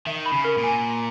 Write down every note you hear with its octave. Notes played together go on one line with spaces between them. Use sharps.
D#3 E5
B5
C#3
A#4
A#2
G#5